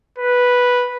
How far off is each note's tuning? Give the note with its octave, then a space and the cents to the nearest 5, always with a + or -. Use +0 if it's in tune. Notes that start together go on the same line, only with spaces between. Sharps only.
B4 -5